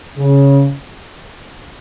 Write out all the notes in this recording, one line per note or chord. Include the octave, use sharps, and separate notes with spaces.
C#3